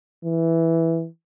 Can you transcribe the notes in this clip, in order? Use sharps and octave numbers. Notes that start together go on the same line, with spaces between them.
E3